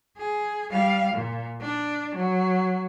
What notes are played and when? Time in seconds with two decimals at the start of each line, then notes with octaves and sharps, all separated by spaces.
0.18 G#4
0.71 G3 F5
1.14 A#2
1.61 D4
2.16 F#3